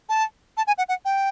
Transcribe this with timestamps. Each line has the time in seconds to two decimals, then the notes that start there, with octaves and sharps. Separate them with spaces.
0.09 A5
0.57 A5
0.67 G#5
0.78 F#5
0.89 F#5
1.05 G5